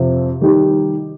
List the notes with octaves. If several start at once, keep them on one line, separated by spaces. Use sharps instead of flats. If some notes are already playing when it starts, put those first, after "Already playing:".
Already playing: F2 C3 F3
D#3 G3 D#4 G4